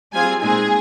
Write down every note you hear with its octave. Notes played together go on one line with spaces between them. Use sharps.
G3 C4 F4 G#4 G#5
A#2 G#3 C4 D#4 G#4 G#5